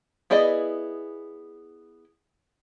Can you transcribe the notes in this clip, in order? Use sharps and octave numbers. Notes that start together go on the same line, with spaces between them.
B3 E4 G#4 D5 D#5